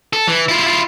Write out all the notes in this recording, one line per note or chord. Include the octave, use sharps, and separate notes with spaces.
A4
E3
E4 F4
E4 F4